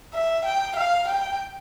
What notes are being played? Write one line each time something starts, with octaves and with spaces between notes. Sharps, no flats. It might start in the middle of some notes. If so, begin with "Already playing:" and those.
E5
G5
F5
G5